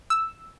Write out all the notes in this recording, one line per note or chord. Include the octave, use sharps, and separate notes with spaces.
E6